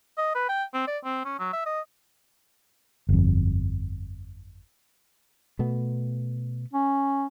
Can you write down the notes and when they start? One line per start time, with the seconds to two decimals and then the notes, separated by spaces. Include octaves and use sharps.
0.18 D#5
0.35 B4
0.49 G5
0.74 C4
0.87 D5
1.04 C4
1.25 C#4
1.39 F#3
1.53 E5
1.66 D#5
3.09 G1 F2
5.59 B2 A3 B3
6.74 C#4